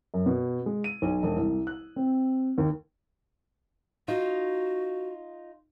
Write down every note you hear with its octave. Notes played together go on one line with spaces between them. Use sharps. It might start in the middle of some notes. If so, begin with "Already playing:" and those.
F#2
B2
G#3
D#7
B1
E1
C2
F#6
C4
D#2
D#4 F4 F#4